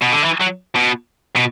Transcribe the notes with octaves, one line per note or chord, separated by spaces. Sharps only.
B2
D3
E3
F#3
B2
B2